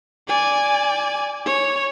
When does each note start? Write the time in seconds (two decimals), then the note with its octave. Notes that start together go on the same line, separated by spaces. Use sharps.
0.27 D5 G#5
1.46 C#5